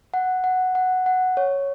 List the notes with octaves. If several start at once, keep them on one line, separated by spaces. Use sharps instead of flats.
F#5
F#5
F#5
F#5
C#5